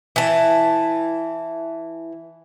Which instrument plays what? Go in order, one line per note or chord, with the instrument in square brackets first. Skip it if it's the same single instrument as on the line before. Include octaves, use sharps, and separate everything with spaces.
[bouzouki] E3 A5